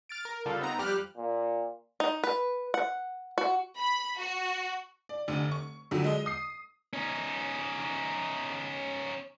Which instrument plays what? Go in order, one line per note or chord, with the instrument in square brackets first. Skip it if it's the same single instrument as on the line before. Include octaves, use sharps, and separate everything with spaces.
[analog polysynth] F6 A6 D7
A#4
C#3 G3 F4 A4
B3 C4 D#4 A#5
F2 G3 G4 F6 F#6
[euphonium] A#2
[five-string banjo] D#4
B4
F#5
F#4
[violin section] B5
F#4
[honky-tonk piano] D5
F1 D3
C#6
F2 D3 F#3
G#3 D#5
D#6 C7
[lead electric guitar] C#4 D#4